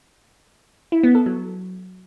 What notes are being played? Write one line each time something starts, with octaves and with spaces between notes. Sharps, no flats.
E4
B3
A4
F#3